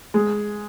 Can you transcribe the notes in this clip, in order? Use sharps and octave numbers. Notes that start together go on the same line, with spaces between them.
G#3